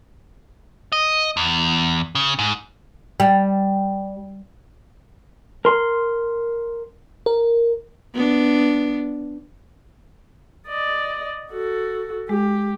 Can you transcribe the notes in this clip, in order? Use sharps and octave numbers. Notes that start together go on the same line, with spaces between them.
D#5
E2
C#3
G#2
G3
A#4 C6
A#4
B3 D4
D5 D#5
F#4 A4
G#3 G4